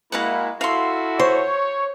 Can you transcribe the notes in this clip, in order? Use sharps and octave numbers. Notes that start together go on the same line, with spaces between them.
G#3 A#3 E4 F#4 F5 F#5
E4 F#4 A4 F5 C6
C5 C#5